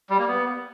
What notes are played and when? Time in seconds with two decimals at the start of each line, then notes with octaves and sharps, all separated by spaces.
0.10 G3
0.19 A#3
0.28 B3